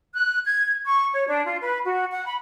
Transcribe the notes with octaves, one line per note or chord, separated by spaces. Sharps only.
F#6
G#6
C#6
C#5
D4
F4
B4
F#4
F#5
B5